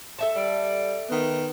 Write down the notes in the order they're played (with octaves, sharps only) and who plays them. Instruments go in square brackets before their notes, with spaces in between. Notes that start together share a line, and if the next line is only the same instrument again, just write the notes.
[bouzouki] A4 E5 A5
[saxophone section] G3 D5
D#3 B3